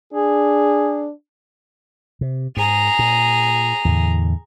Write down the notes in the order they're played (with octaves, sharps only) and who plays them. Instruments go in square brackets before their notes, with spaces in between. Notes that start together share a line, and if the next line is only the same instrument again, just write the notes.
[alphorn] D4 [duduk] G#4
[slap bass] C3
[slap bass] G#2 [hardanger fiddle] G#4 A#5
[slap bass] A#2
E2 A2 D3